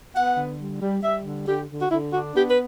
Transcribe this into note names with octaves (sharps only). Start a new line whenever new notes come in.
B3 F#5
D3
G3
G3
G3 E5
D3
D3 G4
D3
F#4
D3 E4
D4 F#4
B3 G4
B4